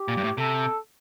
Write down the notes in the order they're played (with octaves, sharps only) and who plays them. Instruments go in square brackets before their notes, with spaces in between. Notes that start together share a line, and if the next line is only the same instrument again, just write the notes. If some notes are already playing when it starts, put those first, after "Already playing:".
Already playing: [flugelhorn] G4
[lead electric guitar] A#2
G2
A2
[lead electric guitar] C3 [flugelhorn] A4